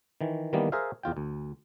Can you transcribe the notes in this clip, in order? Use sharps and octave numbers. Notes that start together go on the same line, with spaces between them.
D#3 E3
D#3 E3 G3 A#3 B3
G#4 A#4 C5 E5 F5
E2 F4 G5
D2